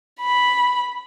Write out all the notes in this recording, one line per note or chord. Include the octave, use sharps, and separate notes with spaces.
B5